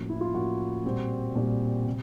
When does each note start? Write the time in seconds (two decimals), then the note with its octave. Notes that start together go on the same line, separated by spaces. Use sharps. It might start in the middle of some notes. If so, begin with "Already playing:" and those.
Already playing: A2 F3 A#3 C#4 F#4
0.09 E4
0.21 F4
0.34 A2 F3 A#3 C#4 F#4
0.84 A#2 G3 C4
1.35 A#2 G3 C4
1.87 C3